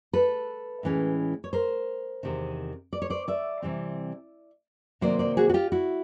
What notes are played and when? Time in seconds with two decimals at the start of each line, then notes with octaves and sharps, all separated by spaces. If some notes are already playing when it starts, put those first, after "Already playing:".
0.13 A4 B4
0.83 A2 E3 G#3 C#4
1.44 C#5
1.53 A#4 C5
2.23 E2 C3 D#3
2.93 D5
3.02 C#5
3.10 C5 D5
3.28 D5 E5
3.62 C3 E3 G3 C4
5.01 C3 D#3 F#3 A#3 C5 D5
5.19 C5 D5
5.37 F#4 G#4
5.49 F#4
5.54 F4 G4
5.72 E4 F#4